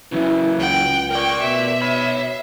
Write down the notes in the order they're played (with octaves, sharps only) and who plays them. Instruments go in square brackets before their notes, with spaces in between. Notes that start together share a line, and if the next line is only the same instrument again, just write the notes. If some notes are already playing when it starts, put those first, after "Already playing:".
[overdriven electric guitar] C#3 F#3 [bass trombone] E3
[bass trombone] C#2 [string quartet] F#5 G5
[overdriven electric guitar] A#4 D5 [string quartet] G5 C#6
[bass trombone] B2 [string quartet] E5
[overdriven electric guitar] C#5 B5